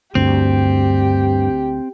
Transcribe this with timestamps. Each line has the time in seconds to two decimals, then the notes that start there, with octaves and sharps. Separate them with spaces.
0.15 D2 G2 C4 G4